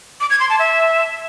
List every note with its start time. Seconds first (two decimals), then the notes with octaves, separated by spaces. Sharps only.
0.20 D6
0.30 G#6
0.40 C6
0.49 A5
0.59 E5